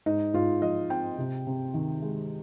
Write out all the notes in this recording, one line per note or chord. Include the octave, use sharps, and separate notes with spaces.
G#2 D#4
G#2 F4
F3 D#5
C4 G5
C3
C3
D#3
G#3